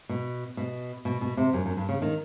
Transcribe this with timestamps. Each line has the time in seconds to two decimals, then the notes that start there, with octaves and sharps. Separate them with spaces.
0.09 B2
0.57 B2
1.05 B2
1.21 B2
1.37 C3
1.53 F#2
1.66 F#2
1.77 G2
1.89 C#3
2.02 D#3